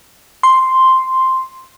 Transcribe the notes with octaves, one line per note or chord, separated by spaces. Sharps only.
C6